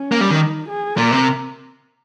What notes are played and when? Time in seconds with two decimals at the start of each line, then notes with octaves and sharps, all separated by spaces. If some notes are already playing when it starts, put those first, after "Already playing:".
Already playing: C#4
0.12 A#3
0.21 G3
0.31 D#3
0.41 D#4
0.69 G#4
0.98 A#2 A#4
1.12 C3